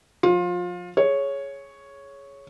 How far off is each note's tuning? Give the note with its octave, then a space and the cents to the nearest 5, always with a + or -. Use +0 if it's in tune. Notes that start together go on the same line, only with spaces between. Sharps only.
F3 +35 F4 +25
G#4 +15 C#5 +0